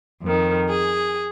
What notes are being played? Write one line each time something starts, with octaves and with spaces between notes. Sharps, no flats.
F2 D#3
G#4